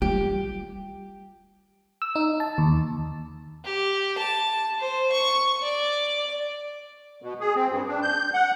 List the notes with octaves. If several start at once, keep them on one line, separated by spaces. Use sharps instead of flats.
G3 F4 G4
E6
D#4
A5
D#2
G4
A5
C5
C#6
D5
B2
G#4
C4
G2
D4
G6
F#5